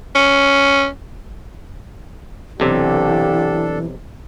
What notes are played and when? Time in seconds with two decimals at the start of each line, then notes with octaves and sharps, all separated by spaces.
0.15 C#4
2.60 B1 C3 E3 D4 G4 A4